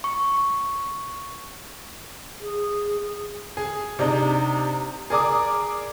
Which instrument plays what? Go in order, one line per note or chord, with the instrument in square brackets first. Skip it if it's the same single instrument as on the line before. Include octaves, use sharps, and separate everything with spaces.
[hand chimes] C#6
[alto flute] G#4
[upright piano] G#4
C3 D4 D#4
G#4 A#4 D5 A#5 D6 D#6